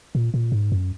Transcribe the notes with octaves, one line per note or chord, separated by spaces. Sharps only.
A#2
A#2
G#2
F#2